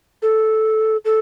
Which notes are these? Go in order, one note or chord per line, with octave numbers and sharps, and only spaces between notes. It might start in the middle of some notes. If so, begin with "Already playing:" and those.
A4
A4